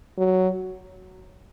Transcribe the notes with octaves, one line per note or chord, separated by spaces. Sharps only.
F#3